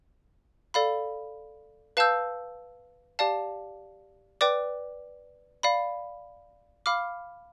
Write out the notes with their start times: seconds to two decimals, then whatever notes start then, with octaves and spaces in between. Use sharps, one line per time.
0.74 A4 D5 F5 B5
1.97 B4 F5 A5 E6 G6
3.19 G4 D5 F5 A5
4.41 B4 D5 G5 D6
5.63 D5 F5 B5
6.86 F5 B5 D6 F6